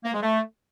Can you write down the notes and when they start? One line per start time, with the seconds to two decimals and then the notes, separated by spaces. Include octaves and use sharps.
0.05 A#3
0.14 G#3
0.23 A3